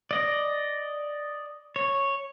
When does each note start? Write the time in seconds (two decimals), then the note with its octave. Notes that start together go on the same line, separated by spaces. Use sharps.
0.11 D5 D#5
1.76 C#5